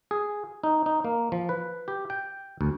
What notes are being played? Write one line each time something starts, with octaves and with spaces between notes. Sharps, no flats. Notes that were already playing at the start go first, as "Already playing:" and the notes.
G#4
D#4
D#4
A#3
F3
B4
G4
G5
D2